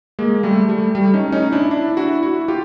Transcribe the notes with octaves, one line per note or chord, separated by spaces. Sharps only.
G#3 A#3
G3 A3
G3 A3
G3 A3
C#4 D#4
C#4 D#4
D4 E4
D4 E4
E4 F#4
E4 F#4
F4 G4